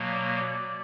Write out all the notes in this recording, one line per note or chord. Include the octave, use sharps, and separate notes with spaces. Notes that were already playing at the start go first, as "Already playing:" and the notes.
Already playing: B2 F#3 A#3
D5
D5